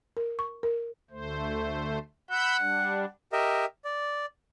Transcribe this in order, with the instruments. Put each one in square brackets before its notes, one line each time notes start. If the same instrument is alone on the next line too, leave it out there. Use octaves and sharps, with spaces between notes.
[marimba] A#4
C#6
A#4
[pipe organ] D2 A3 C5
[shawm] F#5 [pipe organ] B5 E6 G6
[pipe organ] G3 D4
[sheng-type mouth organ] G4 A#4 D#5 E5
D5